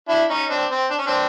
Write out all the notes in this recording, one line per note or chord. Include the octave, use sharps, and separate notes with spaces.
D4 E4
C#4 D#4
C4 D4
C4
D4
C#4
C4 D4